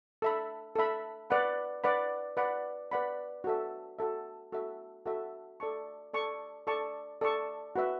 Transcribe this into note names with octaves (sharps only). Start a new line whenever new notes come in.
A4 E5 B5
A4 E5 B5
B4 D5 F#5 B5
B4 D5 F#5 B5
B4 D5 F#5 B5
B4 D5 F#5 B5
F#4 A4 E5
F#4 A4 E5
F#4 A4 E5
F#4 A4 E5
A4 D5 A5 C#6
A4 D5 A5 C#6
A4 D5 A5 C#6
A4 D5 A5 C#6
F#4 B4 E5